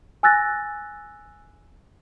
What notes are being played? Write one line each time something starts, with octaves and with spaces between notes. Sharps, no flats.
G#5 E6 F#6 A6 A#6